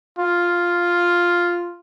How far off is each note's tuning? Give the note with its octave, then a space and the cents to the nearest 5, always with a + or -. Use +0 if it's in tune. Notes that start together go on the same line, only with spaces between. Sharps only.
F4 +0